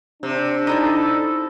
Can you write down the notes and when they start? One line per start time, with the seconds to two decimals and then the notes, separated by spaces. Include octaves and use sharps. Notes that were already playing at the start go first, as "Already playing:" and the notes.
0.23 C3 D4
0.67 D#4 E4 A4 D5